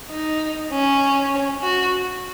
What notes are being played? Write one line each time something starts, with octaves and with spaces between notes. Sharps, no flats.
D#4
C#4
F#4